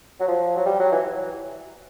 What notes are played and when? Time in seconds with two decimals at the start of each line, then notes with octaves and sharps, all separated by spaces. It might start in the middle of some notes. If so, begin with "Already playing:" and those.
0.20 F#3
0.28 F3
0.57 F#3
0.66 G3
0.80 F#3
0.92 E3